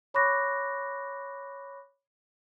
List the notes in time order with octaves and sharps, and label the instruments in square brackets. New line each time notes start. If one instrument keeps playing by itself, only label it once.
[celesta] C#5 B5 C#6 D6 F#6 A#6